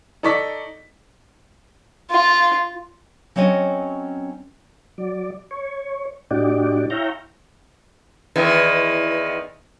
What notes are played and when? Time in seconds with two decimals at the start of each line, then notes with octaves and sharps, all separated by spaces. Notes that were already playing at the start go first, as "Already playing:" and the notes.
0.23 D#4 A4 D5 C#6 B6
2.10 F4
3.36 F#3 C4 C#4 C#5 D#5
4.98 F#3 D5
5.51 C#5
6.31 A2 D4 D#4 F#4 G4 D5
6.90 E4 C#5 E5 F5 G5 A#5
8.36 E2 D#3 E3